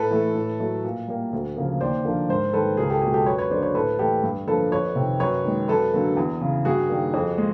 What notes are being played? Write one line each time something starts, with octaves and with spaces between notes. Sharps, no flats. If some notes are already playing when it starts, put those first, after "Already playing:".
Already playing: A2 A4 B4
E3 A3
A2
F#3 A3
A#2
G3 A#3
D2
C#3 F3 A#3
D#2 C5 D5
D3 F3 A#3
G#2 A#4 C5
D#3 G3 A#3 A4 B4
C#2 G#4 A#4
G4 A4
B2 G#3 F#4 G#4
G4 A4
F#2 B4 C#5
B4 C#5
D3 F#3 A#3 C5 D5
B4 C#5
A2 A4 B4
E3 A3 G4 A4
G2
D3 F3 A#3 A4 B4
F2 B4 C#5
C3 D#3
F#2 B4 C#5
D#3 G#3
F#2 A4 B4
D3 F#3 A#3
E2
C#3 E3
G2 F#4 G#4
D#3 G3 A#3
F2
G#3